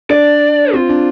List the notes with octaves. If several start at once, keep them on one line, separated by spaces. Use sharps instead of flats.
D4 D5
C4 F4
D4